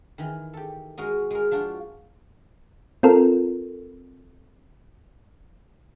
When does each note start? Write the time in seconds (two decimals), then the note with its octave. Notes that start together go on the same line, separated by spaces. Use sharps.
0.18 D#3 E3
0.54 G4 A4
0.98 G#3 F#4 A#4 D#5
1.31 G#3 A#4
1.51 F3 D4 F4 F#4
3.03 C4 F4 A4 A#4